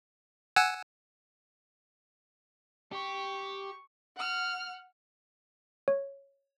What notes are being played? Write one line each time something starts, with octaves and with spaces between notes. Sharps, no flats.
F#5 G#5 E6
G4 C#6
F#5 F6
C#5